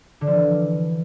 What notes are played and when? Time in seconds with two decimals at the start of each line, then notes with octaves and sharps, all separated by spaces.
0.21 D3
0.27 F3
0.33 E3